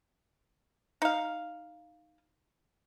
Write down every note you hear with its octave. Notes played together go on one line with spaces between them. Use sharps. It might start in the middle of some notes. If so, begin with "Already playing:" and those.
D#4 F5